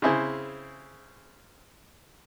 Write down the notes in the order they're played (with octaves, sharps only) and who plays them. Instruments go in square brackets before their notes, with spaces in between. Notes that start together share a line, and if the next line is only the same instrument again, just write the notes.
[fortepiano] C#3 C4 E4 G#4 C5